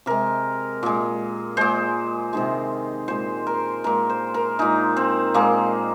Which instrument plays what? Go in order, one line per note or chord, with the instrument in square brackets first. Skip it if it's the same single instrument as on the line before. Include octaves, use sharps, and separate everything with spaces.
[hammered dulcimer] C3 G#3 A#4
A#2 G#3
A#2 G#3 C5
C3 D#3 G#3
A#2 G#3 C5
A#4
A#2 G#3 A#4
C5
A#4
A#2 G#3 D#4
C4
A#2 G#3 A#3